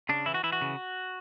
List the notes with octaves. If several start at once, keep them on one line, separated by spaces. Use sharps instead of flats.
C#3 D4
E3 E4
F#4
E3 E4
F#4
C#3